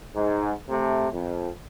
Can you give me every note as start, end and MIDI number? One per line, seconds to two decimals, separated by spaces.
0.16 0.52 44
0.69 1.08 48
0.69 1.08 57
1.13 1.49 41